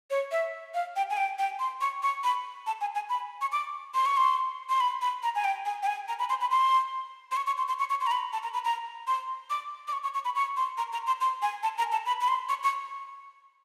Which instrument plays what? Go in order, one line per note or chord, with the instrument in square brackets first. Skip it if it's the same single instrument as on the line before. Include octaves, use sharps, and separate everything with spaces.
[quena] C#5
E5
F5
G5
G#5
G5
G5
C6
C#6
C#6
B5
A5
G#5
G#5
B5
C#6
D6
C6
C#6
C6
C6
B5
B5
A#5
G#5
G5
G#5
G5
G#5
A#5
B5
C6
B5
C6
C6
C#6
C#6
C6
C6
C#6
C#6
C6
A#5
B5
A5
A#5
B5
A#5
C6
D6
D6
C#6
C#6
C#6
B5
C#6
C6
A#5
A#5
C6
C6
G#5
A5
A#5
A5
B5
B5
C6
C#6
C#6